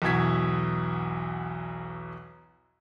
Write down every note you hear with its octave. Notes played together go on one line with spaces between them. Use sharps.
B1 E2 B2 E4 G#6 B6